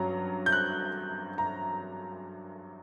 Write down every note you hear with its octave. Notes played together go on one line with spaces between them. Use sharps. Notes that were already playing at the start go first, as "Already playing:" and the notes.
Already playing: G2 F#3 C#4 A#5
G6
F#6
A#5